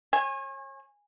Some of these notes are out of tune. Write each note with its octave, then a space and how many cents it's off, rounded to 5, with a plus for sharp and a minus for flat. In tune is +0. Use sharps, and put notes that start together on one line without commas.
C#5 -35 G#5 -15